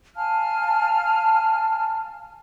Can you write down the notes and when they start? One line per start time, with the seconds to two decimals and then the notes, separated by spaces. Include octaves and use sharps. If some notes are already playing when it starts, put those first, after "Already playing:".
0.16 F5 G#5 A5 F6